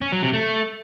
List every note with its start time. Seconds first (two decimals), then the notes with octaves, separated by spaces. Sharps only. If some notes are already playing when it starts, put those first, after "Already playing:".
0.02 C#4
0.12 F#3
0.23 C3
0.33 A3